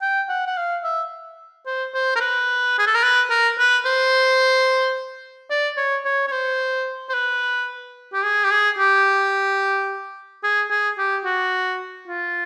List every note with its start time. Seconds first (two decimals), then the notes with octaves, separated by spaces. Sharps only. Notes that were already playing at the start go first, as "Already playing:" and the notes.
0.02 G5
0.29 F#5
0.47 F#5
0.57 F5
0.84 E5
1.66 C5
1.94 C5
2.16 A#4
2.20 B4
2.79 G#4
2.87 A4
2.95 A#4
3.03 B4
3.30 A#4
3.58 B4
3.85 C5
5.50 D5
5.77 C#5
6.05 C#5
6.27 C#5
6.32 C5
7.09 C5
7.14 B4
8.13 G4
8.23 G#4
8.44 G4
8.51 G#4
8.78 G4
10.44 G#4
10.70 G#4
10.98 G4
11.25 F#4
12.07 F4